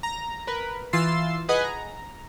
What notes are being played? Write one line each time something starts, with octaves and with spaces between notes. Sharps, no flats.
A#5
A#4 B4
E3 F4 C6 E6 A6 C7
G#4 B4 D#5 F#5 G#5
A#5